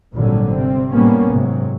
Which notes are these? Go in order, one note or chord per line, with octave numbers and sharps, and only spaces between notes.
G#1 A#2 D3 F#3 G3
C3 G3 C4
A2 G3 A#3 B3 C#4
G#2 C3 F#3